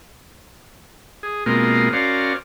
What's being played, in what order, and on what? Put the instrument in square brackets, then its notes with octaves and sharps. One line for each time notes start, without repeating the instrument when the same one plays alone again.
[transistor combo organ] G#4
B2 G#3 A#3 C4 F4 A#4
C#4 F#4 A#4 C5 D5 F5